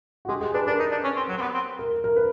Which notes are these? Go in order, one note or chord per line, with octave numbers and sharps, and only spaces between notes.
F#4
G#3 G4
G#3 G#4
D4 B4
D4 A#4
D#4
D4
C#4
C4
F#3
C4
B3
C4
A#4
A#4
B4